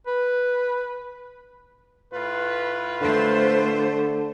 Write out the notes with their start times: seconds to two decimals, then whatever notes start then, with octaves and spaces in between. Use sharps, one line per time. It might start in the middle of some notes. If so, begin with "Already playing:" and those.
0.07 B4
2.13 A2 F4 B4
3.01 D3 A3 C5